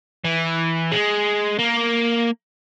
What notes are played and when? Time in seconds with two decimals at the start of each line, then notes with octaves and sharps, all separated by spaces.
0.24 E3
0.92 G#3
1.59 A#3